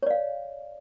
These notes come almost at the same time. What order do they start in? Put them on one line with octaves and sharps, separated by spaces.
C#5 D5 F5